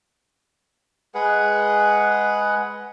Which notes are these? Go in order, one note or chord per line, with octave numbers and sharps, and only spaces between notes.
G#3 G#4 B4 F#5